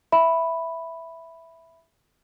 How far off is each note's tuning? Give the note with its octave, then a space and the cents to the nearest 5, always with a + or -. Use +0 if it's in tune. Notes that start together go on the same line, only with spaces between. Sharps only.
E5 +0 B5 +0